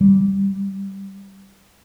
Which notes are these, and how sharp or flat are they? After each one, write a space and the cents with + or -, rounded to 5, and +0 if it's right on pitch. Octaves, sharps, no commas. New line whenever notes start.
G3 -5